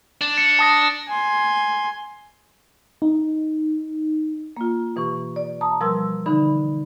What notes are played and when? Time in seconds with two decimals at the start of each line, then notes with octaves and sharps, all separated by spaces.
0.21 D4
0.38 C#7
0.59 A5 D#6 A#6
1.08 G#5 C6
3.02 D#4
4.57 A#3 F4
4.96 B2 E3 G4 C#6
5.36 D5
5.61 A5 A#5 D#6
5.81 B2 F3 G3 A#4 C6 E6
6.26 D3 E3 D#4 B5